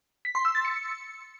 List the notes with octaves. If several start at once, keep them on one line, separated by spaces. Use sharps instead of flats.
B6
C6
E6
A6
C#7